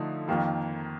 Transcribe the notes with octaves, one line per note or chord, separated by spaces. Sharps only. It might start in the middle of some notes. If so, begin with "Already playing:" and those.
Already playing: D3 F3 A3 D#4
F2 D#3 A#3